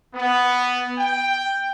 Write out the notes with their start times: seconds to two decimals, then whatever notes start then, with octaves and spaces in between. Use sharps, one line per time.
0.15 B3
0.98 G5